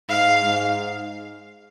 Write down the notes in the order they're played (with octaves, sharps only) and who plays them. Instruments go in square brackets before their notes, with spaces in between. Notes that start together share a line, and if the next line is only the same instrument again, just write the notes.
[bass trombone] G#2 [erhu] F5
[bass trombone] G#2